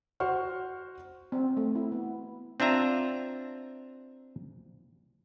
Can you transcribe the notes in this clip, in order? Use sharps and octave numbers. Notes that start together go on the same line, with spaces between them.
F#4 C5 F#5 C#6 F6
C4
A3
E4
B3
C4 D4 F4 E5 A#5